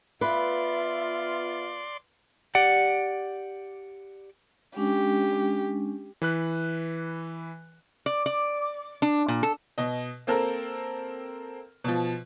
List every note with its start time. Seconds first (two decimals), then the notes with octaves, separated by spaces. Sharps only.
0.21 B3 F4 B4 D5 E5 C6
2.55 G4 D5 F#5
4.76 G#3 C#4 D4 G4
6.22 E3 B4 F#6
8.06 D5
8.26 D5
9.02 D4
9.28 A#2
9.43 A4
9.78 B2 D#5
10.27 A#3 C4 A4 A#4
11.84 B2 F3